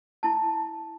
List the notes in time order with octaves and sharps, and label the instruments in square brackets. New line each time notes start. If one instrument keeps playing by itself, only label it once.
[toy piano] E4 A5